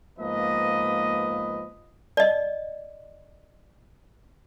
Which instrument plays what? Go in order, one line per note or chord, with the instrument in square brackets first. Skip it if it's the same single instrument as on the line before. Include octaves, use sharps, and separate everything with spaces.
[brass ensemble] G#2 F3 A#3 B3 B4 D#5
[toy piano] D5 D#5